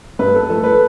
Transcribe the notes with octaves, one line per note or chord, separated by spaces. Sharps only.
G2 B4
A4
F3 A3 A4
B4